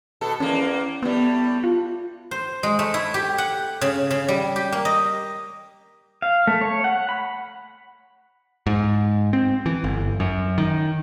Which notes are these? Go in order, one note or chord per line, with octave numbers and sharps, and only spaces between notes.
B2 A4
E2 A#3 C#4
A2 G3 B3
F4
C5
G#3
A3
E4
G4
F#5
C#3
C#3
G3
G4
A#3
D#5
F5
A3
C#5
F#5
B5
G#2
C4
E3
G1
F#2
D#3